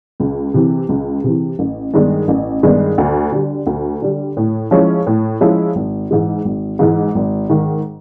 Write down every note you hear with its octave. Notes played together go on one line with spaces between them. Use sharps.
C#2
C3 E3
C#2
C3 E3
A1
G2 D#3 G#3 B3
A1
G2 D#3 G#3 B3
D2
D3 G3
D2
D3 G3
A2
F3 G#3 C#4 E4
A2
F3 G#3 C#4 E4
G#1
G#2 E3 G#3
G#1
G#2 E3 G#3
G#1
G#2 D#3